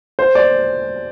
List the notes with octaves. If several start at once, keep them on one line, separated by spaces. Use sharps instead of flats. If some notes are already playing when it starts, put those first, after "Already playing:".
C5
D5